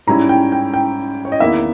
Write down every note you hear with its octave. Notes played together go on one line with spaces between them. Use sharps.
G#2 G3 C#4 E4 A#5
G5
G5
G5
C#5
D#5
E2 D#3 A#3 E4 E5